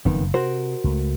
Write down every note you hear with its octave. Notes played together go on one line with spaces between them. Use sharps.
F#1 F2 D#3 B3
C3 F#4 A#4 C5
C#2 A3